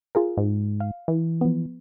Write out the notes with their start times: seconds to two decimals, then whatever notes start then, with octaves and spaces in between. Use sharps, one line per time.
0.15 F4 G#4 A#4
0.37 G#2
0.80 F5
1.08 E3
1.41 F3 B3